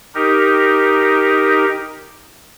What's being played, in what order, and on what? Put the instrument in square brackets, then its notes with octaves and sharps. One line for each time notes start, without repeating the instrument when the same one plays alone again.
[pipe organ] D#4 G4 A#4